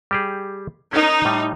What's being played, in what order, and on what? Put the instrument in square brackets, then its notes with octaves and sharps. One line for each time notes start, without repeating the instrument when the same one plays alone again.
[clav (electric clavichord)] G3 G4 G#4
[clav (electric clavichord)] C#4 A#4 [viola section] D#4
[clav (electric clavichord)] A2 G3